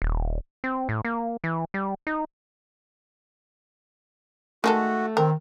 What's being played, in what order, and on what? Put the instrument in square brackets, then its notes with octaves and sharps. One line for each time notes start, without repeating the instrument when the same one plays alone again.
[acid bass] D#1
C4
A2
A#3
E3
G3
D#4
[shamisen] D#3 G#3 A4 [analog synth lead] A3 [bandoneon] F#4
[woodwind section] D#3 [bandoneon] C4 [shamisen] A#4